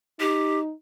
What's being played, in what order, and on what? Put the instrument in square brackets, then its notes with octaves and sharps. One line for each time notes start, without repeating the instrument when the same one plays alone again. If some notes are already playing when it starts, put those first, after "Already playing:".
[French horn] D#4 [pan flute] G4